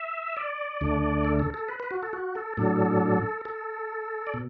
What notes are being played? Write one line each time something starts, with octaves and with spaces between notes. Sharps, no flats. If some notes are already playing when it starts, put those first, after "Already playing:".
Already playing: E5
D5
D2 D3 A3 D4
A4
A4
A4
B4
B4
F#4
A4
F#4
A4
A2 F#3 D4 A4
A4
D5
B2